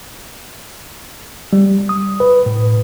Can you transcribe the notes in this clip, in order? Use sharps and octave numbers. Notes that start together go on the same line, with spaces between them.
G3
D#6
B4
A2